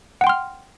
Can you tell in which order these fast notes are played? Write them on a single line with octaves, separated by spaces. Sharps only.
F#5 G5 C6 F6